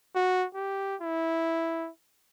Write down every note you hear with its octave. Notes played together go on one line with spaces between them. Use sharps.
F#4
G4
E4